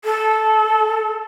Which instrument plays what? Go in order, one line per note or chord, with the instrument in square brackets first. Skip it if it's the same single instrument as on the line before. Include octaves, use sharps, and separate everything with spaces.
[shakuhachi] A4